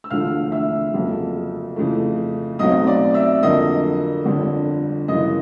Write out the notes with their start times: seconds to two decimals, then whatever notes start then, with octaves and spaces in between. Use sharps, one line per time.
0.04 E6
0.10 E1 D2 D3 F3 A3 F5 F6
0.52 E5 E6
0.94 F#1 F2 C#3 F#3
1.76 F2 C#3 E3 A3
2.59 B1 B2 F#3 A3 C4 D#5 D#6
2.87 D5 D6
3.14 E5 E6
3.43 F2 D3 F#3 A#3 D#5 D#6
4.26 G1 F2 D3 G3
5.08 F#2 C#3 E3 D#5 D#6